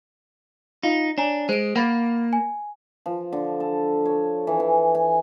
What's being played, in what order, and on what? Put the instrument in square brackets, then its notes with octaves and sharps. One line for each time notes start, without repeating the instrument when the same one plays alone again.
[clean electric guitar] D#4 [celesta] F4 F5
[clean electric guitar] D4 [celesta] C#5 G#5 A#5
[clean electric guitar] G#3 [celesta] C5 D7
[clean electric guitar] A#3 [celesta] F#5 B5 A6
[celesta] G#5
[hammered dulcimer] F3
D3
A4
C#5
E3
G#5
G#5